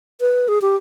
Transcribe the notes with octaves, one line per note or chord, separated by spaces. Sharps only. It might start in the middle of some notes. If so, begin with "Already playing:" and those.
B4
G#4
G4